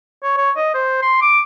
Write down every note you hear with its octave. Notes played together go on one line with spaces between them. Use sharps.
C#5
C#5
D#5
C5
C6
D6